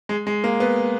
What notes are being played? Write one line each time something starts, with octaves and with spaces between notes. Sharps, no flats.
G#3
G#3
A#3
B3